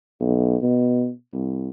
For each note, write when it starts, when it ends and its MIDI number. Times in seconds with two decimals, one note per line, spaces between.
0.21 0.57 35
0.63 1.09 47
1.34 1.70 36